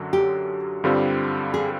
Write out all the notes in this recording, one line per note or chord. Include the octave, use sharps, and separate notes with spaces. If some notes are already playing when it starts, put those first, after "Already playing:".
Already playing: F#2 D3 F#3
G4
G2 D3 G3 C4 F4
G#4